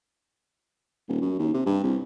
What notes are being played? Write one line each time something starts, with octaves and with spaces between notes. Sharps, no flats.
D#1
F#2
D#2
C3
G2
C2